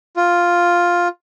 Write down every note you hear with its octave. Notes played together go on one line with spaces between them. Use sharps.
F4